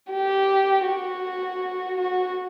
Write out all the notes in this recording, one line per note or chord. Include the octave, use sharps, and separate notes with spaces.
G4
F#4
F#4